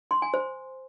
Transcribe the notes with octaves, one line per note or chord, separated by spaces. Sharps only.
C6
G#5
C5